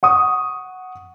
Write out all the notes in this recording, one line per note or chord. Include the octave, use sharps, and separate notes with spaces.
F#5 C#6 D#6